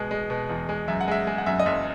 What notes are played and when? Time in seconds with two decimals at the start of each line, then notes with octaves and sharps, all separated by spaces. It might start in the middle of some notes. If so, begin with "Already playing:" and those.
Already playing: B2 G#3
0.11 G#3
0.30 B2
0.49 E2
0.69 G#3
0.88 F#2 E5
1.01 F#5
1.08 G#3 E5
1.27 G#3
1.38 F#5
1.46 F#2 E5
1.60 D#5
1.66 F#1 E5